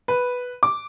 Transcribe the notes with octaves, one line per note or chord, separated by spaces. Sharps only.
B4
D6